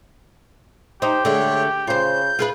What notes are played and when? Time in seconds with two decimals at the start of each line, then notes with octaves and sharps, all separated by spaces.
1.02 D#4 G4 C5
1.25 D3 G#3 A3 C#5
1.87 C#3 F4 C5 G6
2.39 F4 G#4 B4